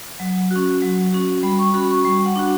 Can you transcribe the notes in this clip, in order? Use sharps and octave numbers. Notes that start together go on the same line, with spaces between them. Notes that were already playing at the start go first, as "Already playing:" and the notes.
F#3
C#4 F#4
F#3
C#4 F#4
G3 B5
C#6
C#4 F#4 B5
C#6
G3 C#6
F#5
D4 F#4